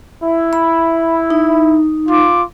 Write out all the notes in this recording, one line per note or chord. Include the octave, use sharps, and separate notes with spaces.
E4
B5
D#4
F4 D6